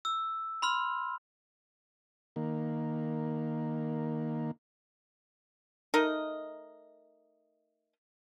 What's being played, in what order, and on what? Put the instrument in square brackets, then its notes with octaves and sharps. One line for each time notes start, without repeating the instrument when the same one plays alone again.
[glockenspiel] E6
B5 C6 F6
[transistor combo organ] D#3 A#3
[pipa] A3 D#4 A#4 D#5